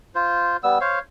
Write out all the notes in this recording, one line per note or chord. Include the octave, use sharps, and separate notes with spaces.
F4 C5
G3 B3 E6
C5 C#5 F5